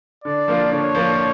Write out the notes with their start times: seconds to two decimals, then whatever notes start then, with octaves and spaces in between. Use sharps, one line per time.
0.24 D3 D5
0.48 F3 A#3 D4 F4
0.72 D3 C#5
0.95 F3 A#3 D4 F4